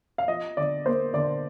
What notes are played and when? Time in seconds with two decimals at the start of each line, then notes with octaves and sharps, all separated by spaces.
0.18 F5
0.28 F3 D#5
0.57 D3 D5
0.85 A#3 C5
1.14 D3 D5